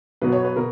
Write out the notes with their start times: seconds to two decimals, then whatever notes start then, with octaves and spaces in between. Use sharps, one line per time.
0.22 B2 F#3 B3 B4
0.32 C#5
0.44 B4
0.56 B2 A#4